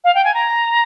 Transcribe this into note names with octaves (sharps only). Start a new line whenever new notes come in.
F5
G5
G#5
A#5